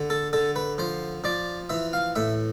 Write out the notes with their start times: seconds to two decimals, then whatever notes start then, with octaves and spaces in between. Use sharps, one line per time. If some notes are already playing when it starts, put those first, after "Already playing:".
Already playing: D3
0.10 A4
0.33 D3 A4
0.56 B4
0.78 F3 C5
1.24 F3 D5
1.69 E3 E5
1.93 F5
2.15 A2 E5